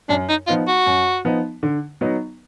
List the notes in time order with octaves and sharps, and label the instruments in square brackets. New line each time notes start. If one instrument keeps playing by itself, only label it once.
[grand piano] F#2 [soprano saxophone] D4
[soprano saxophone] D#4
[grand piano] F3 B3 D#4 [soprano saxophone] F4
[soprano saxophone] F#4
[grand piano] F#2
F3 B3 D#4
D3
F#3 B3 D#4